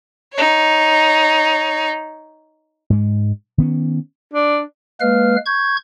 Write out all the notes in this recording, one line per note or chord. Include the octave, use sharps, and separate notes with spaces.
D#4 C#5
G#2 G#3
D#3 B3 C#4
D4
G#3 A#3 B4 F5 F6
C#6 G6 G#6